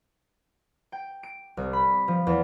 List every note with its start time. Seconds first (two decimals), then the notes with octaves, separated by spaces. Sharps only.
0.92 G5
1.23 D7
1.57 C2
1.73 B5
2.08 F3
2.27 E2